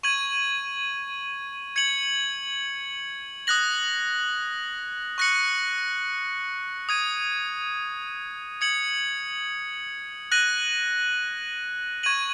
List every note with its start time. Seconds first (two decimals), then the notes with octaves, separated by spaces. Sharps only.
0.03 C#6 G#6 D#7 F#7
1.76 G#6 C#7 F#7
3.47 D#6 F#6 A#6 F#7
5.18 C#6 F#6 A#6 C#7 F#7
6.89 D#6 G#6 D#7
8.61 D#6 G#6 C#7 F#7
10.32 F#6 A#6 D#7 F#7
12.03 C#6 G#6 D#7 F#7